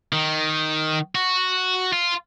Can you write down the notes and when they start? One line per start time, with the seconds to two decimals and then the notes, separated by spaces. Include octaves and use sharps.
0.13 D#3
1.15 F#4
1.93 F4